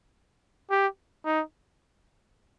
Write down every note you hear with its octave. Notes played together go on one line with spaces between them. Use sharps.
G4
D#4